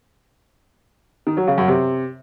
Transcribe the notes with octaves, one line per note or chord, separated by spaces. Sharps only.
D#3
F#3
C#3
F#2
C3